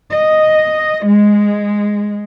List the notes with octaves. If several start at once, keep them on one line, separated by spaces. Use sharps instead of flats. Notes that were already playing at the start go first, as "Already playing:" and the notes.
D#5
G#3